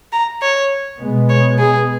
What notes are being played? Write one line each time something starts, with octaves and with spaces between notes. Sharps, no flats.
A#5
C#5
B2 G#3 B3
C#5
G#4